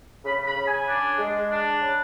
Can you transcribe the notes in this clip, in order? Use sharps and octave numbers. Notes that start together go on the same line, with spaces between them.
C#3 B5
B5
C#3
G#5
D4
G#3
D4
C#3